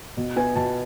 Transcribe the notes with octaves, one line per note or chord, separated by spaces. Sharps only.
B2
B3 G#5
B2 A5